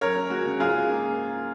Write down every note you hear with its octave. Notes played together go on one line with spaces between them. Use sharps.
F#2 A#4 C#5
C#4
G#3 F#4
C#3
G#2 F4 G#4
C#4
A#3